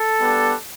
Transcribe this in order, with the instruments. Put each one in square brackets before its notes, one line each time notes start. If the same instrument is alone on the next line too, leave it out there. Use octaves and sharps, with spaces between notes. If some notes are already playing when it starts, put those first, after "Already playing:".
Already playing: [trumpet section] A4
G3 B3 D4